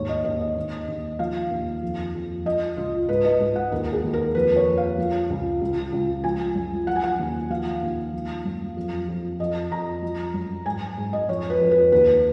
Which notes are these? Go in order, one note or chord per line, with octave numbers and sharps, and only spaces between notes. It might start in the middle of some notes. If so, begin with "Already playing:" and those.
Already playing: D#2 G#2 C#5
D#5
D#2 D#5
D#5
D#2
D#2
F3 F5
D#2
F2
F2
F3 D#5
C#2 F4
G#2 B4
D#5
G#2 D#5
F#5
D#2 A#4
G#4
D#2
A#4
F2 B4
C#5
F2
F5
F3
C#2
C#2
C#2
F3 G#5
F#2
F3 F#5
G#5
F#5
D#2
F3 F5
D#2
F3
F#2
F2
F2
F2 D#5
F2 A#5
F3
F#2
G#2 G#5
G#2
D#5
F2 C#5
B4
F2
B4
D#2 B4